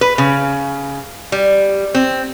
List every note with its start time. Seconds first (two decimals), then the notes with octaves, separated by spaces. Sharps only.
0.01 B4
0.18 C#3
1.32 G3
1.95 C4